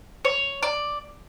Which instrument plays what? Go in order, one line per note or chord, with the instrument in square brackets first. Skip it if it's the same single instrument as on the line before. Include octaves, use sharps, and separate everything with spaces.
[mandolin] C#5
D5